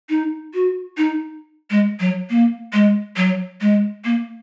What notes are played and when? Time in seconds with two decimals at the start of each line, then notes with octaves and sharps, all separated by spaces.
0.10 D#4
0.54 F#4
0.97 D#4
1.70 G#3
2.00 F#3
2.30 A#3
2.73 G#3
3.17 F#3
3.61 G#3
4.05 A#3